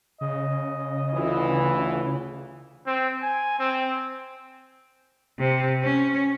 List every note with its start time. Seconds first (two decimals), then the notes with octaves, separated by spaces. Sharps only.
0.21 C#3 D#5
1.14 D2 E3 F4
2.87 C4
3.23 G#5
3.59 C4
5.39 C3
5.83 C#4